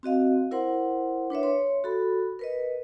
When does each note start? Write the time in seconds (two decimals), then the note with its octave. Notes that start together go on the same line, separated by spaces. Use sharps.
0.03 C4 F#4 D#5 F5
0.51 E4 A#4 C5 F#5 C6
1.30 D4 B4 C#5 E5
1.43 C#5 C6
1.84 F#4 A4 B5
2.39 A#4 B4 D#5